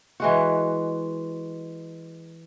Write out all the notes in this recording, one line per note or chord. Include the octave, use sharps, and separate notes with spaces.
E3 G#3 F#4